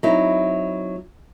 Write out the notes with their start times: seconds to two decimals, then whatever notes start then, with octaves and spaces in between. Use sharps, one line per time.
0.03 F#3 C4 D#4 E4